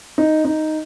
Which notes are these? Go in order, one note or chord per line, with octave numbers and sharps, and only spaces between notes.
D#4
D#4